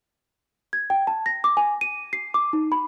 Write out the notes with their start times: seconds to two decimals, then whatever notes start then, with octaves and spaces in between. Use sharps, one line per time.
0.73 G#6
0.90 G5
1.07 A5
1.26 A#6
1.44 D6
1.57 G#5
1.81 D#7
2.13 C7
2.34 D6
2.53 D#4
2.72 B5